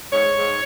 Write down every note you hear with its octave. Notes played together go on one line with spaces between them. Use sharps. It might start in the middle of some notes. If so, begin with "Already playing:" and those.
G#2 C#5
G#2